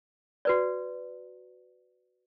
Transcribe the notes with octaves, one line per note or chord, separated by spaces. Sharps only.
F#4 B4 D5